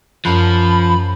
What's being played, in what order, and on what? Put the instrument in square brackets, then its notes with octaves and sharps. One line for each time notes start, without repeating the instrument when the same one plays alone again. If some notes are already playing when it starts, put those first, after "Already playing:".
[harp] F#2 A5 F#6 [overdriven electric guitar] F3 [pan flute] B5